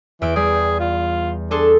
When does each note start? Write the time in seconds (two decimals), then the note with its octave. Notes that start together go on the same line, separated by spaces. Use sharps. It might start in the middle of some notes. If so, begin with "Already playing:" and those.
0.22 E2 E3 E6 D7
0.36 G3 G#4
0.80 F4
1.51 D4 G#4 A4 C6